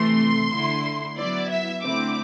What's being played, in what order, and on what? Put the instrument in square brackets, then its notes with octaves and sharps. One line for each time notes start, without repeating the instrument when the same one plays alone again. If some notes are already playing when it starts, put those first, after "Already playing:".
Already playing: [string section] C3 E3 A3 C6
D3 A3 E4
F#3 B3 E4 D5
E5
D3 A3 C4 E4 D6